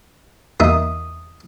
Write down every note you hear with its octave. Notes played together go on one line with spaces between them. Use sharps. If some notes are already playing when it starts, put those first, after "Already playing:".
E2 A#3 D#4 E5 D#6